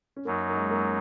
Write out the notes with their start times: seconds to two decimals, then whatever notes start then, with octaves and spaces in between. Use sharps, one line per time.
0.16 C#4
0.25 F#2 F#3 A#3 D#4
0.49 A#3
0.56 G#3
0.70 A#3